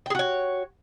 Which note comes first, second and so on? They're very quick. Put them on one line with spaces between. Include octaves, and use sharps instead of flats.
G5 G#4 F#4 C#5